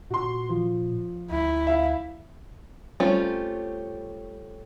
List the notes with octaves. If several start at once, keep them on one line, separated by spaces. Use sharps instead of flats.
A#2 F#4 C6
F3
D2 E4
E5 F5
G3 A3 C4 C#4 F4